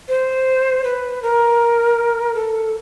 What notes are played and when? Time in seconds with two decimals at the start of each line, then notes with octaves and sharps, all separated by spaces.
0.08 C5
0.84 B4
1.22 A#4
2.35 A4